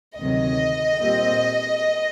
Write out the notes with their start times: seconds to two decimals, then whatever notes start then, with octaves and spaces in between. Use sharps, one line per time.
0.18 D2 C3 D#3 F#3 D#5
1.00 A#2 G3 C4